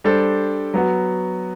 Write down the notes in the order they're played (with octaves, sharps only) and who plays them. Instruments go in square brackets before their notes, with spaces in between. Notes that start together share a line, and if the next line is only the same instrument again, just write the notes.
[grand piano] G3 D4 A4 C5
F#3 B3 F#4